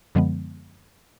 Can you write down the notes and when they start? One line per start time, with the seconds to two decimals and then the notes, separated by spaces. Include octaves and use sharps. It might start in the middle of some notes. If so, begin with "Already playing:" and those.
0.15 F#2 D3 F3 G#3 B3